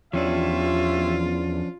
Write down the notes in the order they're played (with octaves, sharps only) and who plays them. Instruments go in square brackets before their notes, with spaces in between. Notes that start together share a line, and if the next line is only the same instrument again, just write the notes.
[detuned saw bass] E2 [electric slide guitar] F3 C#4 D4 [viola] F4 [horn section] G4 C#5 E5